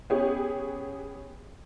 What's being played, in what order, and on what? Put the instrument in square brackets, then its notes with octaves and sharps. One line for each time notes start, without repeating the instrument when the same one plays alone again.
[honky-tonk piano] B3 C#4 G4 G#4